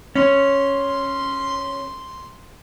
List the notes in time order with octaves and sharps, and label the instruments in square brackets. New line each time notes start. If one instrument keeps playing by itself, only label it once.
[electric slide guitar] C#4 [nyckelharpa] C6